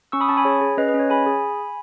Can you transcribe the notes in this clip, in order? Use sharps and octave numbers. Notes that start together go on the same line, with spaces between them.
C#4 C#6 E6
B5 D#6
C#4 A5 C#6
G#5 B5
G#4 C#5
G#4
C#4 B4 D#5
B4 D#5
C#4
C#5
G#4 G#5 B5
G#4